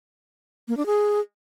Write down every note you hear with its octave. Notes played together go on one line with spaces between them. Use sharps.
A#3
D4
G#4